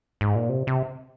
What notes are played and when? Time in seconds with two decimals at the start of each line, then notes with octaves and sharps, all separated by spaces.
0.21 G#2
0.35 A#2
0.49 C3
0.67 C3